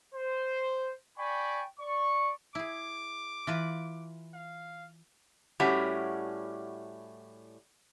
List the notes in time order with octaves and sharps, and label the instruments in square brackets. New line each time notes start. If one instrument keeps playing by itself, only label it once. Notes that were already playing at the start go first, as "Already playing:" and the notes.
[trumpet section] C5
D5 G5 G#5 B5 C#6
D5 C#6
[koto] E4 G#4 [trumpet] D6
[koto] E3 F4 B4
[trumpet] F5
[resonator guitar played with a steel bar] A2 G3 C#4 F#4 G4 E5